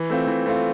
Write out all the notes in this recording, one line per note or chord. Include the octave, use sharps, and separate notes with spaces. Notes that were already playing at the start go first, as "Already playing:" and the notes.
Already playing: E3
A3 C4 F4
E3
A3 C4 F4